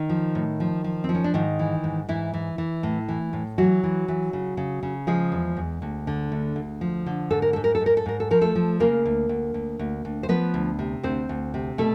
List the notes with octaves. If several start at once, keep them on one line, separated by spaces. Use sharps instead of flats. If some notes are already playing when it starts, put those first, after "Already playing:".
Already playing: D#3 D#4
F3
A2
F3
F3
F3 C4
C#4
D4
G#2 D#3 D#4
E3
G#2
G#2 E3 E4
E3
E3
A2
E3
A2
E3 F#3 F#4
E3
E3
C#3
C#3
C#3
F3 G#3 G#4
E2
E2
D2
D3
D2
D2
F3
D3
G#2 A4
A#4
G#2 A4
A#4
A4
G#2
A#4
A4
G#2 A#4
A4
F3 A#4
A3 A4
F3
C#3 A#3 A#4
D2
D2
D2
D2
D2
C5
F3 B3 B4
D2
C3
D2 C4 C5
D2
C3
B2 A3 A4